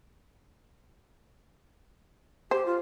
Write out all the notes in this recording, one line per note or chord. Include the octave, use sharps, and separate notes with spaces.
G4 C5
F4